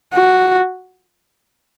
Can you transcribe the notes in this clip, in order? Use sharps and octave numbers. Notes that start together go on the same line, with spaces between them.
F#4